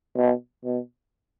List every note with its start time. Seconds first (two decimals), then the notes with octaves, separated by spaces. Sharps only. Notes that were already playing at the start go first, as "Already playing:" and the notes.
0.18 B2
0.65 B2